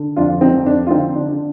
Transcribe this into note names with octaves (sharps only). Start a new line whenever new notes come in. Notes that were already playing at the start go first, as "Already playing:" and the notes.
Already playing: D3
F2 D4 F4
C4 D#4
F2
D4
F4
D3 C4 D#4
D4
D3